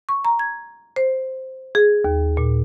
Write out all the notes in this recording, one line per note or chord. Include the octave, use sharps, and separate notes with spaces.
C#6
A#5
G#6
C5
G#4
D#2
A#2